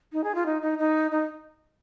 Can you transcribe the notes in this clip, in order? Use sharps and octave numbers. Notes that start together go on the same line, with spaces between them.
D#4
G#4
F4
D#4
D#4
D#4
D#4